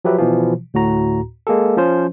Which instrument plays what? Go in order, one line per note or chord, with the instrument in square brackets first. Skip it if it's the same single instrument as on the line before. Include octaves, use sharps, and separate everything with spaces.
[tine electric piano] F3 F#3 G4 B4 E5
B2 E3 F3
D2 A2 F#4 A#5
G#3 A#3 G#4 A4
F3 C#4 C5